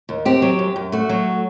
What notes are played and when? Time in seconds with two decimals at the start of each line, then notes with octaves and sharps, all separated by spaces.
0.09 D#2
0.25 C4 G4
0.42 F#3
0.59 F#2
0.76 F#2
0.92 A3 F#4
1.09 F#3